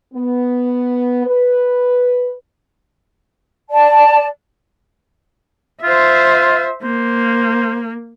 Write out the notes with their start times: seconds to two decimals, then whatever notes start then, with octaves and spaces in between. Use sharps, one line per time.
0.14 B3
1.26 B4
3.70 D5 A5
5.83 F4 C5 E5
6.83 A#3 C5